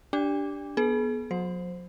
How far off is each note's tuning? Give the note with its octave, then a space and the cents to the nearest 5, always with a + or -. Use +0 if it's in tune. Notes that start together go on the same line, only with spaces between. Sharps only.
D4 -10 G4 -5 G5 +45
B3 -20 G#4 +40
F#3 -40 C5 +0